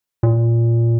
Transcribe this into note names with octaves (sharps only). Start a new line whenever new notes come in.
A#2